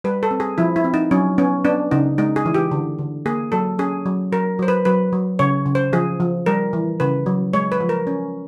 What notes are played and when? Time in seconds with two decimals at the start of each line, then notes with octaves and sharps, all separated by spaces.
0.04 G3 B4
0.23 A4
0.31 C4
0.40 G#4
0.58 F3 E4
0.76 E4
0.84 C4
0.94 D#4
1.11 F#3 C#4
1.38 B3 C#4
1.65 B3 D4
1.91 C#3 D#4
2.18 G#3 D#4
2.36 G#4
2.46 E3
2.54 G4
2.71 D3
2.98 D3
3.26 A#3 G#4
3.52 F#3 A4
3.79 C#4 G#4
4.06 F#3
4.32 F#3 A#4
4.59 F#3 C5
4.68 B4
4.85 F#3 B4
5.13 F#3
5.39 C#3 C#5
5.66 C#3
5.75 C5
5.93 F3 G#4
6.20 F3
6.46 G3 A#4
6.73 E3
7.00 C#3 B4
7.26 F#3
7.53 G#3 C#5
7.72 B4
7.80 F3
7.89 A#4
8.07 C#4